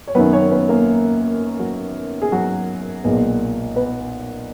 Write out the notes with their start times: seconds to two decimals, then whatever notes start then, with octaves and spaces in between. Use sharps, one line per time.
0.07 C#5
0.15 F#2 D#3 F#3 B3 B4
0.33 C#4 C#5
0.51 B3 B4
0.69 A#3 A#4
1.59 F#3 F#4
2.22 G#4
2.32 F#3 F#4
3.04 B1 A#2 G#3 B3
3.76 B3 B4